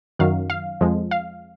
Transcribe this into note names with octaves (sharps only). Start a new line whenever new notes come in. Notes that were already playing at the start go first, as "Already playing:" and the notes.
F#2 D#3 F#3 F5
F5
F2 F3 G#3
F5